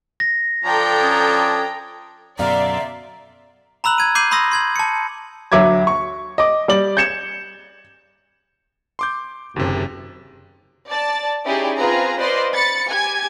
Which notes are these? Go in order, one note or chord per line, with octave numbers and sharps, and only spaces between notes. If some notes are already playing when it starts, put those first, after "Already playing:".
A#6
F3 D4 A4 G5 A#5
C#4 D#6 G#6
F#2 B2 D3 D5 E5 F5 A#5 C6
A#5 B5 E6 F#6 F#7
G#6 D#7
D6 G6 C7 D#7 F#7
B5 C6 D#6 E6 A#6
C6 G#6 F#7
A5 C#7
D2 F#3 E5 D6 G#6
C#6
D#5 D6
G3 D5 F#7
G6 G#6 C#7 E7
C6 D6 G6
F#1 D#2 C3
D5 A5 A6
C#4 D#4 E4 G4 G#4 D5
C4 F4 G#4 B4 A#5
B4 C5 D5 D#5 F5 C6
B5 A6 C#7
G4 G#5 G#6